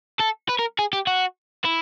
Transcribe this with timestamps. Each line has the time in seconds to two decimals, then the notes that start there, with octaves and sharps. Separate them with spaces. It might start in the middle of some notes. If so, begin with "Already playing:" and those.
0.20 A4
0.49 B4
0.59 A#4
0.79 G#4
0.93 G4
1.07 F#4
1.65 E4